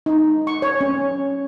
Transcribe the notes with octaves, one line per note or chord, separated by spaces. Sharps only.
D#4
C#6
C#5
C#4